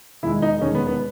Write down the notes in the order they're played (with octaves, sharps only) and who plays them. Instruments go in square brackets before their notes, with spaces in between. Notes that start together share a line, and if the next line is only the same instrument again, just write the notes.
[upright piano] E1 D#2 D#3 G#3 [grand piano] E4
[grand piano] D#4
[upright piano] E1 D#2 D#3 G#3 [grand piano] C#4
[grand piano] B3
B3